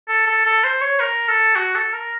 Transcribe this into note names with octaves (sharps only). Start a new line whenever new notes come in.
A4
A4
A4
C5
C#5
A#4
A4
F#4
A4
A#4